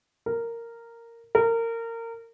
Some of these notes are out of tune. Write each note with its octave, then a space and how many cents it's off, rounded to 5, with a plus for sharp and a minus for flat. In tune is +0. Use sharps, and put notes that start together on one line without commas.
A#4 -10
A#4 -25